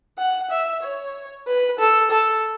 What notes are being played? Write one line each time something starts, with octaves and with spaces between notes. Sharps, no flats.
F#5
E5
C#5
B4
A4
A4